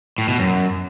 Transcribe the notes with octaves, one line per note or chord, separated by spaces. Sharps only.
A2
B2
F#2